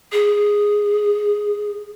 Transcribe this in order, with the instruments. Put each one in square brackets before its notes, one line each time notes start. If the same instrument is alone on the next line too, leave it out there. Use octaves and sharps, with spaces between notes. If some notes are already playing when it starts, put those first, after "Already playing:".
[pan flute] G#4